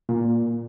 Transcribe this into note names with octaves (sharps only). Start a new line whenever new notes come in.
A#2